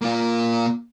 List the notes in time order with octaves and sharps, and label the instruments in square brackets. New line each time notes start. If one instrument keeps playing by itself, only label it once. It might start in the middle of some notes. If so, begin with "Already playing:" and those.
[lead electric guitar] A#3 F4